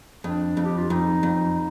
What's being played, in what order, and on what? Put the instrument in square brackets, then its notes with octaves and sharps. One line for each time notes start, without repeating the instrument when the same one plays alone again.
[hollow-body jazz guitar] F2 [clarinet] D4
[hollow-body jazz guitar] F2
[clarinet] G4
F4
[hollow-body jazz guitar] F2 [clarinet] D#4
[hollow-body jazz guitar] F2